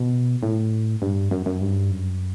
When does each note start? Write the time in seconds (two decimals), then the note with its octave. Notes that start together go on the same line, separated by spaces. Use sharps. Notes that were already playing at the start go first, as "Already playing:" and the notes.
Already playing: B2
0.43 A2
1.02 G2
1.31 F#2
1.46 F#2
1.61 G2
1.91 F#2